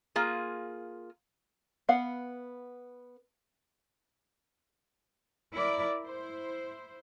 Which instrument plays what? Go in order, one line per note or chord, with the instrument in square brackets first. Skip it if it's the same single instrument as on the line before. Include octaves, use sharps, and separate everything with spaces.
[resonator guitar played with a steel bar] A#3 F4 G#4
[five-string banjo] B3 F5 F#5
[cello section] E4 A#4 D5
E4 C5